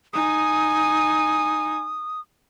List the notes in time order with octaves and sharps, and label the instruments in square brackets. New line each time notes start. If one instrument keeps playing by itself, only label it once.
[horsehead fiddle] D#4 G#5 [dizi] D#6